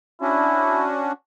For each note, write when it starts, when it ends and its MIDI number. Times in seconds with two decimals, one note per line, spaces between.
0.22 1.12 61
0.22 1.12 62
0.22 0.86 64
0.22 1.12 66